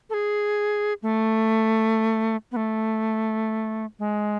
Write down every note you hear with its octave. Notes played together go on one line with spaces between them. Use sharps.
A4
G#4
A3
B3
A3
G#3